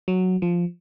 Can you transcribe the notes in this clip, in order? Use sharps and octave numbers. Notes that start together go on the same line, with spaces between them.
F#3
F3